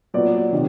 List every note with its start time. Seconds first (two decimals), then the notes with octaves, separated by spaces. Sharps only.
0.14 A#2 F#3 B3 D5
0.52 C3 D#3